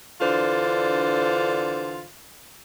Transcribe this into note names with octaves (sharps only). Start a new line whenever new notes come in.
D3 E3 D4 F4 A4 C5